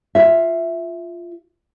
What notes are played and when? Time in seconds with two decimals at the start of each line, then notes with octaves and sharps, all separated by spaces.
0.15 F4 E5